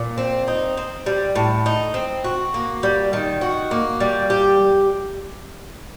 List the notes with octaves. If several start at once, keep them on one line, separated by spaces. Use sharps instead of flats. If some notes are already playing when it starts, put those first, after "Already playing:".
Already playing: A#2
C4
D#4
C4
G3
A2
D#4
C4
F#4
A#3
G3
D#3
F#4
A#3
G3
G4